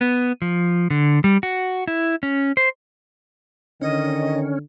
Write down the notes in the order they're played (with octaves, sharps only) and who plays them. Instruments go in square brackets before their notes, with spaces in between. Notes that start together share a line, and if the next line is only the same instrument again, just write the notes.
[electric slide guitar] B3
F3
D3
G3
F#4
E4
C#4
C5
[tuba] D3 [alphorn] D#3 [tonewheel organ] C#4 [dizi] D#5